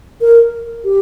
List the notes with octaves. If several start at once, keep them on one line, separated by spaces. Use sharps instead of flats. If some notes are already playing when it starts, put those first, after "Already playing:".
A#4
G4